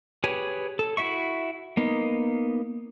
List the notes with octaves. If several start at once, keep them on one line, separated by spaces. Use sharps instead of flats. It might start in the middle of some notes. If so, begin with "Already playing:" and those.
G4 G#4 B4 C#5 G#5
A4
E4 F#4 E5 C#6
A#3 B3 D#4